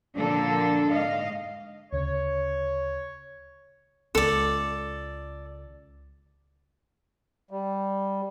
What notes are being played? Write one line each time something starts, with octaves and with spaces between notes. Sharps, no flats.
A#2 D3 F3 A#3 D4 A4
G#2 D#5 F5
D2 C#3 C#5
C#2 A4 D5
G3